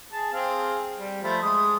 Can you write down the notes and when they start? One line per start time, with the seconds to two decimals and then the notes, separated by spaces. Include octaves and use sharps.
0.12 G#4 A5
0.33 C4 G#4 F5
0.98 G3
1.23 F3 A3 B5
1.42 G#3 D#6